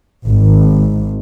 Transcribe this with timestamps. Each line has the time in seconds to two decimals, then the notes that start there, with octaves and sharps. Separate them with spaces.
0.26 G#1